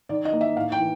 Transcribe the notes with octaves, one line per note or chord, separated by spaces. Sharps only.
D#3 D5
D#5
A#3
E5
A2 F5
G5
E3